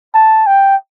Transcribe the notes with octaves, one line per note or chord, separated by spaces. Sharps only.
A5
G5